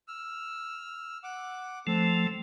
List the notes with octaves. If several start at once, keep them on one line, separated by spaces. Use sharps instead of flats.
E6 F6
F#5 D6
F3 A3 C4 A4